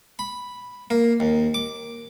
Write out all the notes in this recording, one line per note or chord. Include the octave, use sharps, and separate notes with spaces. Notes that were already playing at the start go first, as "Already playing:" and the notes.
B5
A#3
D#2
D6